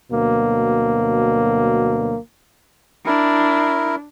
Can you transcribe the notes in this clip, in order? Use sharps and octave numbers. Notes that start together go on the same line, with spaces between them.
D2 B2 F#3 A#3
D4 E4 A#4